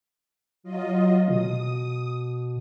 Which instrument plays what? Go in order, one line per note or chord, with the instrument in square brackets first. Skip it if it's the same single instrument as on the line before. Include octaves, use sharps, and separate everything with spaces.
[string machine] F#3 F4 D#5
[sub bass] B2 [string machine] D#6